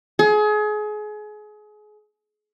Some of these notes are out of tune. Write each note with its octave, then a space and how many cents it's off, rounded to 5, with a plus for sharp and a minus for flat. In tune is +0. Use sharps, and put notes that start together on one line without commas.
G#4 +30